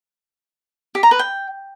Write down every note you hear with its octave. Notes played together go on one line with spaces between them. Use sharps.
G4
A#5
B4
G5